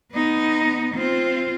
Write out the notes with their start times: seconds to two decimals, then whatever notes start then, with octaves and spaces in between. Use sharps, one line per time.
0.12 B3 D#4
0.94 C4 F4